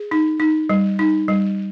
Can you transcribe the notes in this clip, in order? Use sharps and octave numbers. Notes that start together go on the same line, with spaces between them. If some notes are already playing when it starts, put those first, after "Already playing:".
Already playing: G#4
D#4
D#4
G3
D#4
G3